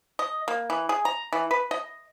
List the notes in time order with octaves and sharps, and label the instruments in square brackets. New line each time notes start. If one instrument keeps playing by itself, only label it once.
[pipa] D#5
A#3
E3
G#4
A#5
E3
B4
D#5